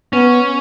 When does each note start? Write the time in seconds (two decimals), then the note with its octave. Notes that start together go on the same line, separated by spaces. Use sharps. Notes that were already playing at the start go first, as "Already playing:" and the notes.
0.13 B3 C#4